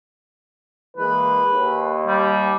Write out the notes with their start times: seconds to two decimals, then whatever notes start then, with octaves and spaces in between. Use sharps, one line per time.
0.97 E3 G#3 A#3 B4
1.50 D#2
2.08 G3